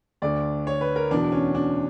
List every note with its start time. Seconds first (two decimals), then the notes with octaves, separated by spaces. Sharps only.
0.22 D2 D3 D5
0.67 C#5
0.81 B4
0.96 A#4
1.10 E2 B2 D4
1.32 C#4
1.55 D4